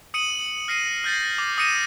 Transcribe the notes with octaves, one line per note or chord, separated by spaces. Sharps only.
D#6 C#7 D#7 F#7
D#7
F6 A#6 C7 C#7 D#7
F6 G6 A6 A#6 C7
D6
D6 D#6 A#6 C#7 D#7 E7